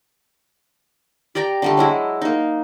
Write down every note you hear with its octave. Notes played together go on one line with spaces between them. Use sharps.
G4 D5 G5 A#5
D3 G3 A3
F#3 G#3 E4
A#3 D#4